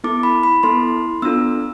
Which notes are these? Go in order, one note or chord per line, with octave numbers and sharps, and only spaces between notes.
B3 E4 A4 D6
B5
B5
B3 E4 A4 C6
B3 D4 F4 A4 E6